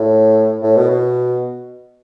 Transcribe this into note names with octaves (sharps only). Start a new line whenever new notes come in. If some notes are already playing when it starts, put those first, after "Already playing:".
Already playing: A2
A2
B2
B2